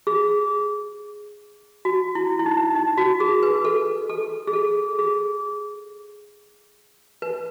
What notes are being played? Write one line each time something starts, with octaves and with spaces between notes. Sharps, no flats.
G#4
F#4
E4
E4
D#4
D#4
F#4
G#4
B4
A4
A4
G#4
A4
G#4
B4